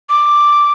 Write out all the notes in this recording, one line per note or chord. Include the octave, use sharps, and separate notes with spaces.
D6